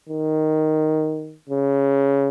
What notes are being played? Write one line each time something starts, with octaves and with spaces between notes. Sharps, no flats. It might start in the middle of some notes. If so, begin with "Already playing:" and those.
D#3
C#3